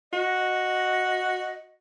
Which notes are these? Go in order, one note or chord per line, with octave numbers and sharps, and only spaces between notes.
F#4 D#5